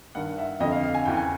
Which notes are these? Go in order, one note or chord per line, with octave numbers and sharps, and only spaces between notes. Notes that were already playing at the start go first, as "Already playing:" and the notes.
G2 D#3 F#5
E5
F2 D3 D#5
F5
F5
G#5
E2 C#3 E3 G5
G#5